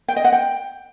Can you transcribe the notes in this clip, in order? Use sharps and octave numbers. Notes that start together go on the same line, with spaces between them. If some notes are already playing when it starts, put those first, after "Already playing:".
G5
D#5
F#5
G5